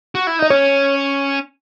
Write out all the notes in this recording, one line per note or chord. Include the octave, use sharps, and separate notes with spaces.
F#4
E4
D#4 D#5
C#4 C#5